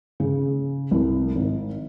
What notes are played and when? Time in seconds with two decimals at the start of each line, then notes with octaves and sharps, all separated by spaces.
0.20 C#3
0.91 C2
1.35 G#1